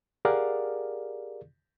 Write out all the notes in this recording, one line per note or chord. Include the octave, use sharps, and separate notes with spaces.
G4 G#4 A#4 D5 F5 F#5